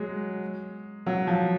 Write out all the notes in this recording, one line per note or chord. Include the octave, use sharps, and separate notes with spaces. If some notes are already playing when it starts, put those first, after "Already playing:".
Already playing: F#3 G#3
F#3
F3